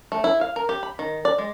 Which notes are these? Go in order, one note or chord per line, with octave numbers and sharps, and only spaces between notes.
A3
E4
F5
A#4
G4
B5
D#3
D5
G#3